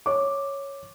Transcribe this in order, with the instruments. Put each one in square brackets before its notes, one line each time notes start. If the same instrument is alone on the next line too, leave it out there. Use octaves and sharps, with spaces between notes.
[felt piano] C#5 D6